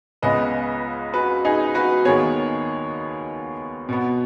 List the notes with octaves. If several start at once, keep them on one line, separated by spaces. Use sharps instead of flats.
C#2 C#3 G#3 B3 B4 D#5
F#4 B4
D#4 G#4
F#4 B4
D#2 D#3 B3 G#4 C#5
B2 B3